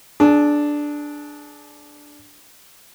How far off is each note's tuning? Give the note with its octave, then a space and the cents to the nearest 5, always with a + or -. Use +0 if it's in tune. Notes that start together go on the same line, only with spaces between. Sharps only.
D4 +0 G#4 +30